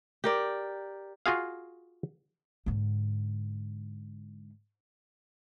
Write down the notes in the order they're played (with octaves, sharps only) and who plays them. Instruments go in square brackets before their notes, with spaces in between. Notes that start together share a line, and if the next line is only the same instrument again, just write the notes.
[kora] G4 A#4 D5
[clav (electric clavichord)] F4 F#4 G#4 F5
[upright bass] G#2 D3